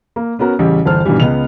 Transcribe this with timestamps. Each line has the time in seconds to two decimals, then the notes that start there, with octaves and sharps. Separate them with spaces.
0.16 A#3
0.39 B3 C#4 F#4 A#4
0.59 A1 C#3 G3
0.85 G1 E2 C5 A5 F6
1.05 G2 B2 D#3 E3 G3
1.20 C#2 B3 D#5 F7